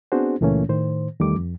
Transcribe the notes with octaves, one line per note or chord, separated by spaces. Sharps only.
B3 C4 D4 F#4 G#4 C5
C#2 A#2 E3 A3 A#3 C#4
A2 D#3 C5
E2 D#3 G3 A3 D6
F2